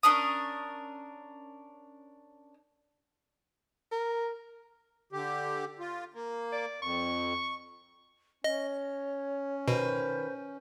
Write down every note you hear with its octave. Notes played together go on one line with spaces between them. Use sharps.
C#4 D4 A#4 D#6
A#4
D3 G4
F4
A#3
D5
F2 C#6
C#4 C#5 D#5
B2 D#3 B4 C5